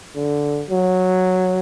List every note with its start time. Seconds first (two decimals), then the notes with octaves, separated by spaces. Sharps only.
0.16 D3
0.70 F#3